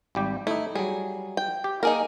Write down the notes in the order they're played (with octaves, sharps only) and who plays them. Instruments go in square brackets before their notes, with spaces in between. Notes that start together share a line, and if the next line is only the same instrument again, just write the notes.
[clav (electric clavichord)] G#1 G3 G4
[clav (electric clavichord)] A3 D#4 [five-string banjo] E4
[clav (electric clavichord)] F#3 G3 [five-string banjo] G#4
[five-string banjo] G5
[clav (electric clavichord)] G4
[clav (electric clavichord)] A#3 [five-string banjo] D#4 G#4 A#4